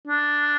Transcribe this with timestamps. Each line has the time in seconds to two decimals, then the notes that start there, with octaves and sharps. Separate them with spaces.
0.07 D4